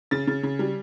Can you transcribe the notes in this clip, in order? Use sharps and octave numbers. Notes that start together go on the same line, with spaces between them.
C#3 A6
C#3
C#3
G3